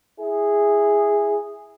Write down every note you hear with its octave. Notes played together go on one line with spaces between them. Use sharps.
E4 G#4